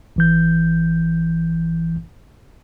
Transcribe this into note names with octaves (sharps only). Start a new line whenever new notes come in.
G#1 E3 G6